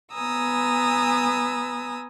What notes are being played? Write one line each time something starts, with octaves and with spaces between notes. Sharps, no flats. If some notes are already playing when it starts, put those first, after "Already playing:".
B3 B4 G#5 A#5 D#6 E6